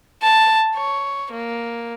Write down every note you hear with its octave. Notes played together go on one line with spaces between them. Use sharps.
A5
C#5
A#3